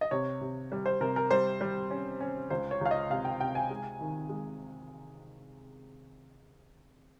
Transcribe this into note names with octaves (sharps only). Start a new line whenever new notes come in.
D#5
C3 C#5
C3
G3
C5
C3 A#4
A#4
G3 C5
G3
C#4
C#4
C#2 C5
C#5
C#2 F5
D#5
C3 F5
G5
C3 G5
G#5
G#3
D#3
G#3